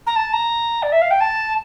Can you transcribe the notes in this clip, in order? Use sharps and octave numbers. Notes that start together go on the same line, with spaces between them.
A#5
A5
A#5
D5
E5
F5
G5
A5